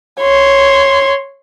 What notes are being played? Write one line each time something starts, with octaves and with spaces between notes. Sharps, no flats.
C#5 C6